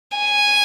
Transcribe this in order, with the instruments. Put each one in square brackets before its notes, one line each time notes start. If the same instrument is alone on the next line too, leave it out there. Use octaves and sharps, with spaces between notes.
[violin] G#5